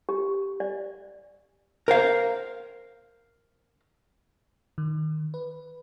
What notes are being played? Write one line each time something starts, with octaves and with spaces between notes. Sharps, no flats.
G4
D5
A#4 C5 F5
D#3
B4